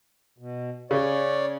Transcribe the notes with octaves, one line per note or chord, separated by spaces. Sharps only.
B2
C#3 C#5 D5